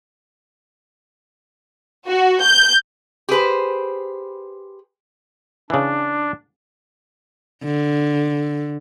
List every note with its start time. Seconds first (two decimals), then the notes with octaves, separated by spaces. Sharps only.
2.08 F#4
2.43 G6
3.29 G4 G#4 B4 C5
5.70 C#3 E3 D4
7.64 D3